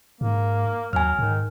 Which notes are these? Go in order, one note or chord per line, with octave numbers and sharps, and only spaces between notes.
G#2 A#3
D#2 F#3 G#5 F6
G#2 D#3